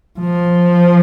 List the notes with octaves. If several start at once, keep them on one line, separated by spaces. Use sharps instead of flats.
F3